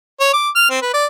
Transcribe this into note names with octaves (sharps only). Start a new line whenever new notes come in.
C#5
D6
F6
C4
B4
D5